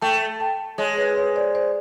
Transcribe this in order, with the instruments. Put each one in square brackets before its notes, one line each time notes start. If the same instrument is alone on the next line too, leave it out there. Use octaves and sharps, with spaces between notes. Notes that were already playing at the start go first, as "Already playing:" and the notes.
[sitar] A3 [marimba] G5 A5
[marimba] G5 A5
[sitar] G#3 [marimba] C#5 D#5
[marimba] B4 C#5
B4 C#5
C5 D5
C5 D5